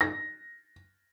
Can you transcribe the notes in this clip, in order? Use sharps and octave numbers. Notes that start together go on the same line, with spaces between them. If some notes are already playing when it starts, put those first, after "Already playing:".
A#6